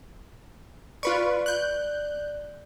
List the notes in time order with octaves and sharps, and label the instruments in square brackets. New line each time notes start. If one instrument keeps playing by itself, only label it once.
[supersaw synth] F4 B4 C#6 [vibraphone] D5
[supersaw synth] F#6 G6